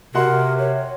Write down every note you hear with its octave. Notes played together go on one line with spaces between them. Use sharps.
C3 F#4 A#4 F#5 C6
C#5